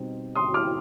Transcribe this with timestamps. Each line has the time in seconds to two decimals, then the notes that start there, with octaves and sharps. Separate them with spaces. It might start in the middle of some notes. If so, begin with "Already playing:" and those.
Already playing: B2 G3 C4 D#4
0.35 C6 D#6
0.54 D6 F6